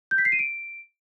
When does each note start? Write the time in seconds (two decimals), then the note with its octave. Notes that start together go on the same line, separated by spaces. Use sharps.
0.11 G6
0.18 B6
0.25 C7
0.32 D#7
0.39 D7